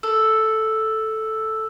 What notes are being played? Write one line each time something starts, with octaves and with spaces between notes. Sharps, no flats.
A4 E6